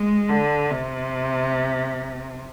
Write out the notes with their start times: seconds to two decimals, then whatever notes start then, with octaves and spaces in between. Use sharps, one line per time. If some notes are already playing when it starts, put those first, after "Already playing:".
Already playing: G#3
0.29 D3
0.70 C3